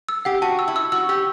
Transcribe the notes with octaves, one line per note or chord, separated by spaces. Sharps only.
E6
G4 F#5
F#4 A5
E6
E4
E6
F#4 E6
G4 E6